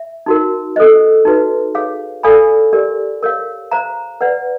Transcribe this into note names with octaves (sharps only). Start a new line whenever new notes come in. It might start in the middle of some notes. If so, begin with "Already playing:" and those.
Already playing: E5
D#4 F#4 A#4
A4 C5 D#5
D#4 F#4 B4
G#4 C#5 F5
A4 D5 F5 G#5 B5
G4 A#4 D5
A#4 C#5 F5
C5 F5 A#5
B4 D5 F#5